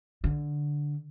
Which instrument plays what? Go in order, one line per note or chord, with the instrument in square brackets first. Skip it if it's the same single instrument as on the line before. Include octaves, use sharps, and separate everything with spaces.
[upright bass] D3